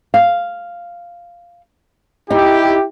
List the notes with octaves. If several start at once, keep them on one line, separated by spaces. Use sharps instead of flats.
F5
D#4 E4 G4